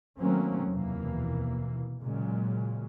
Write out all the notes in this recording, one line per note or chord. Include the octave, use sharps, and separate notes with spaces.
D#3 F#3 A3 A#3 C4 C#4
F1 D#2 B2 E3 A#3
A#2 C#3 F#3 G#3